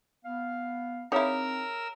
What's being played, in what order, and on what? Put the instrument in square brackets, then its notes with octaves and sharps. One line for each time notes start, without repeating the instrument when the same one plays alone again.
[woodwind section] B3 F5
[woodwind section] C4 [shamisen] D#4 E4 [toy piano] G#4 C#5 F5 [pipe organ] A#4 E6